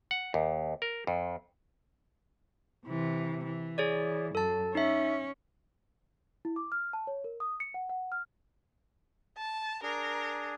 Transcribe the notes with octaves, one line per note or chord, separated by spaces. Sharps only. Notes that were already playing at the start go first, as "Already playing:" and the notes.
F#5
D#2
A#4
F2
C3 E3
E3
G#4 C#5 D5
F#2 A4 A5
C#4 D#4 E5
E4
D6
F6
A5
C#5
A#4
D#6
C#7
F#5
F#5
F6
A5
D4 G#4 A#4